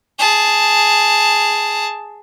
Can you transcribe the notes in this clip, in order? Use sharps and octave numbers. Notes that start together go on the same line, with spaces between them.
G#4 A5